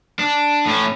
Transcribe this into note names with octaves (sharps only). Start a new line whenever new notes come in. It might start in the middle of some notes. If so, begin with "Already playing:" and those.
D4
A2 C#4